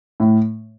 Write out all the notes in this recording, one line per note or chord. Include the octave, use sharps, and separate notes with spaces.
A2